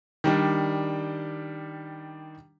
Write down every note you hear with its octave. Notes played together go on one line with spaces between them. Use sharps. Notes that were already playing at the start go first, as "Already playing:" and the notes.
D#3 G3 D4